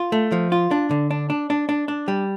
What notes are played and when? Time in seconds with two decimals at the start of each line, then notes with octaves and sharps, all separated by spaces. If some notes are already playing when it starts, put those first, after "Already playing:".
Already playing: F4
0.12 A3
0.32 F3
0.52 F4
0.71 D4
0.91 D3
1.11 D4
1.30 D4
1.50 D4
1.69 D4
1.88 D4
2.08 G3